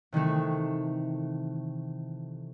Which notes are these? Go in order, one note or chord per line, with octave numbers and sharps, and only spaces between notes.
C3 D#3 E3 A3